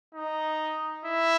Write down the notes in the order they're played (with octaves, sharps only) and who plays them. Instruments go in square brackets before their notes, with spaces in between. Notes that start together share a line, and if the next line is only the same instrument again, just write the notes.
[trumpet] D#4
E4